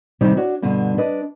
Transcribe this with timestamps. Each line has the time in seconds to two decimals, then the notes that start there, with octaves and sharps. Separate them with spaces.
0.21 C3 D#3 G3 D#4
0.36 D4 F#4 C#5
0.62 G2 B2 D3
0.98 D4 B4 D#5